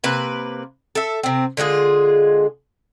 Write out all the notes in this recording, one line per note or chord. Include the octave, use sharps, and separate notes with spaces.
C3 A#3 B4
A4 E5
C3 C4
D3 G#3 F4 G#4